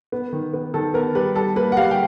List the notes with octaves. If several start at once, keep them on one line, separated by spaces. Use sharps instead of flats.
B3
D#3
B3
D#3 A4
B3 A#4
G3 B4
G3 A4
A#3 B4
F#5
G3 F5
G5